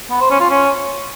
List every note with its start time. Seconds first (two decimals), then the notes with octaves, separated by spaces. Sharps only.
0.11 B3
0.21 C5
0.30 C#4
0.40 F4
0.50 C#4